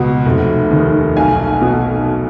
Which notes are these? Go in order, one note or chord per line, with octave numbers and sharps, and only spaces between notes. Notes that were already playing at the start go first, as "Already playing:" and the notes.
Already playing: C#2 B2 F#5
F1
D#2 D#3
B1 F5 G#5
B2